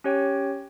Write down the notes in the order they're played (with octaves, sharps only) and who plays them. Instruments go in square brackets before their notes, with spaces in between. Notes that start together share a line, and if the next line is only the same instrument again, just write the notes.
[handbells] C#4 G4 C#5 G5